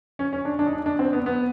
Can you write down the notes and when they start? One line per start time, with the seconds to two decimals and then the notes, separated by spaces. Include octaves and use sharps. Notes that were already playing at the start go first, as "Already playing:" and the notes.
0.19 C#4
0.33 C#4
0.45 D4
0.59 D4
0.66 D#4
0.73 D4
0.86 D4
0.99 C4
1.13 B3
1.26 B3